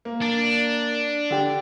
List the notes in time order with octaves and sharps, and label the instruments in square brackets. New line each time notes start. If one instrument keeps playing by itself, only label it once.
[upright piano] A#3
[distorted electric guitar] D4
[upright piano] D3 G4